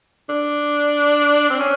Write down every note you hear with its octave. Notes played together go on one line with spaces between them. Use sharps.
D4
C4
C#4